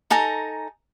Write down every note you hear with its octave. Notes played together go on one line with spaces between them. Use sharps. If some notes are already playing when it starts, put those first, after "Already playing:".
D#4 A4 G#5 A#5